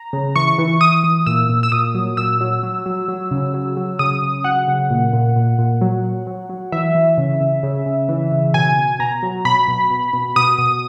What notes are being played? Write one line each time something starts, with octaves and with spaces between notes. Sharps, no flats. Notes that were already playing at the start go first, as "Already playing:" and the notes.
Already playing: A#5
C#3
E3 C#6
E3
E3 D#6
E3
A#2 E6
A#2
E6
A#2 D#6
F#3
A#2 E6
F#3
F#3
F#3
F#3
C#3
F#3
F#3
C#3 D#6
C#3
F#3 F#5
C#3
A#2
A#2
A#2
A#2
F#3
F#3
F#3
F#3
E3 E5
E3
C#3
C#3
C#3
C#3
E3
C#3
B2 G#5
B2
B2 A#5
F#3
B2 B5
B2
B2
B2
B2 D#6
B2